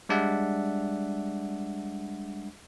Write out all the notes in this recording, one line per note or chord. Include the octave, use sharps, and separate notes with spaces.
G3 G#3 D4 D5 E5 F#5